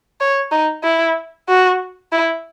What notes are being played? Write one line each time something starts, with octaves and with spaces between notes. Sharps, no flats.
C#5
D#4
E4
F#4
E4